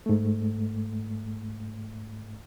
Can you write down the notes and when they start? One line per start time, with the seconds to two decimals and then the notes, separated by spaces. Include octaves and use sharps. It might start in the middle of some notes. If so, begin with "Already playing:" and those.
0.06 G#2 A3